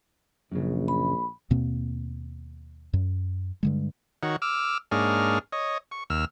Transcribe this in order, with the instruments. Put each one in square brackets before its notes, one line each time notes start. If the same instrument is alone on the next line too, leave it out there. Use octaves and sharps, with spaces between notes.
[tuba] A#1 [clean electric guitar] F#2 C#3
[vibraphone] B5
[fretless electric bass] D#2 B2 A#3 C4
F#2
G2 D3 G#3
[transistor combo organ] D#3 F#4 C#5
D6 E6 F6
G#2 A#3 D4 G#4 C#5 F6
C#5 D#5
C#6
D#2 E6 F6